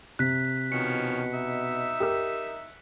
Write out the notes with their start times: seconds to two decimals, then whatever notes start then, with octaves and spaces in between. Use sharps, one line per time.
0.19 C3 F#6 B6
0.72 B2 D#3 F3 C#4 C#7
1.33 D#4 E5
2.00 G4 A#4 E6